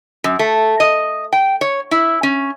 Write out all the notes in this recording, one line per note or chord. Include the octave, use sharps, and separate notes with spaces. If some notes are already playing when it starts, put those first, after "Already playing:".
F#2
A3
D#5
G5
C#5
E4
C#4